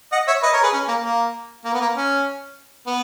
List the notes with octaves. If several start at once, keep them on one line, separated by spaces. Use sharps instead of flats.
D#5 F#5
C#5 E5
B4 D#5
A#4 C#5
G#4 B4
C#4
A#3
A#3
A#3
B3
A#3
C#4
B3